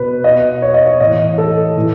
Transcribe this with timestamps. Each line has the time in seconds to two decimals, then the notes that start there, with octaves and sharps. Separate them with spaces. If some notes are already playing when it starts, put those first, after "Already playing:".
Already playing: B2 B4
0.24 B2 D#5
0.62 C#5
0.74 D#5
0.86 C#5
1.00 A2 E3 D#5
1.38 A4
1.76 A2 E3